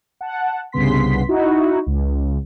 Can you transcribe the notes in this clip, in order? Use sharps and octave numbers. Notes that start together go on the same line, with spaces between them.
F#5 A5
C2 G2 C#3 B3 C6 B6
D#4 E4 F#4
C#2